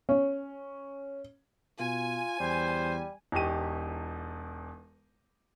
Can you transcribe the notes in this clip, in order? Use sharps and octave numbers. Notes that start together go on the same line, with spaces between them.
C#4
B2 F4 G#5
E2 G3 C5
E1 E2 D#4 G4 C#6 D#7